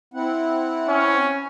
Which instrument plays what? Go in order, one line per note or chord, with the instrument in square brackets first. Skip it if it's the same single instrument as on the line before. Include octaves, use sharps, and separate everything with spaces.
[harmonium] C4 E4 F#5
[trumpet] C#4